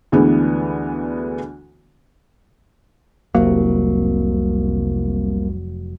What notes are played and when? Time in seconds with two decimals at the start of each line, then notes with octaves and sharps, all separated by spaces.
0.12 D2 D3 E3 G#3 B3
3.35 F1 C2 F#3 A#3